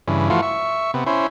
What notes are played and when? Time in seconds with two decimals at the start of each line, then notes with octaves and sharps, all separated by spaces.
0.08 G2 C#3 E3
0.30 E3 F3 A3 F4 F#4
0.42 E5 C#6
0.94 C3 B3
1.07 C#4 E4 C5